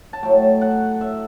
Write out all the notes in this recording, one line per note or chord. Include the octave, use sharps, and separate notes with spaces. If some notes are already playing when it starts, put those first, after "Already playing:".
A5
A2 F#3 A3 G5
F#5
E5